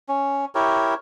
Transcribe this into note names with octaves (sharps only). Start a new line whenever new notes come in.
C#4
E4 G4 A#4 C#5